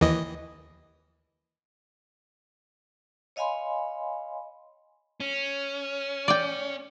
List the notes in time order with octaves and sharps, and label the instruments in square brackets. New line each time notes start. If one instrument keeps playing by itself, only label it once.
[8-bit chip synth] D#2 E3 D#5
[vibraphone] C#5 D#5 F5 G#5 B5 C6
[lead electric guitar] C#4
[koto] D5 G5